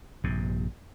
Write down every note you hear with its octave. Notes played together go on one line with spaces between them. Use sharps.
A#1 G2 C3